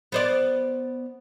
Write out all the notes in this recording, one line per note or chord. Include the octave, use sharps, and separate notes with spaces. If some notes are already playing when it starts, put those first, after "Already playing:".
B3 C5 D5